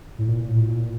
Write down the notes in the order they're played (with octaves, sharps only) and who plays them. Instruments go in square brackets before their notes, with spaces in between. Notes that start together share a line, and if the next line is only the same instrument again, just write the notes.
[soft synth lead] A2
A#2
A2
A#2